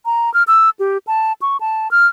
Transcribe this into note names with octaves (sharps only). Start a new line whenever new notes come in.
A#5
F6
E6
G4
A5
C#6
A5
F6